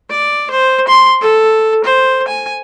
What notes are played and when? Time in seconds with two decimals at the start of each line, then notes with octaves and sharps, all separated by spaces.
0.10 D5
0.51 C5
0.88 C6
1.21 A4
1.84 C5
2.28 G#5